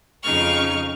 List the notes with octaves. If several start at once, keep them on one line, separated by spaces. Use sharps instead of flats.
F2 C#3 D#4 C#6 F6